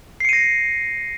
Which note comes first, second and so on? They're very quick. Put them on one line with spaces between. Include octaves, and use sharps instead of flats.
C7 C#7 D#7 A#6